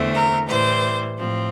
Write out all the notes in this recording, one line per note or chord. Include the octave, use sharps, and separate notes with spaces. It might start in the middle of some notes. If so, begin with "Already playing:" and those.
Already playing: E2 D3 A3 C4
A#4
A2 E3 G3 C5
A2 F3 C4